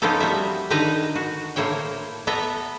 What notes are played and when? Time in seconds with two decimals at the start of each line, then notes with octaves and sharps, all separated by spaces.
0.02 F3 A#3 B3 C#4 D#4 A4
0.20 G3 F#4 E5
0.70 D3 D#3 D#4 B4 G#5 A#5
1.15 F#4
1.56 A2 A#3 E4 C5 C#5 G5
2.27 B3 A4 E5 A#5